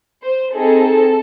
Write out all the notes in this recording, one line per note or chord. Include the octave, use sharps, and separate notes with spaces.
C5
C4 D#4 G#4 A4